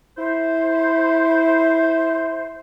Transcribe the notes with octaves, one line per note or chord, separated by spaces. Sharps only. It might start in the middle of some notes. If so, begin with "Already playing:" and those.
E4 C5